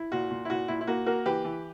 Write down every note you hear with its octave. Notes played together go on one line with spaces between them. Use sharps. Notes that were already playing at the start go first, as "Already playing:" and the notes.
Already playing: E4
A#2 F#4
A#2
E4
A#2 F#4
A#2 E4
E4
A#3 F#4
A#3 F#4 A#4
E3 G4 B4
E3